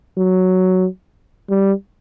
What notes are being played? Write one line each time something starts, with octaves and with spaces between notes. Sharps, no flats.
F#3
G3